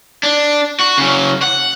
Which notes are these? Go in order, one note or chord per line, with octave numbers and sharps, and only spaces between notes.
D4
F#4
C#3 F#3
F#5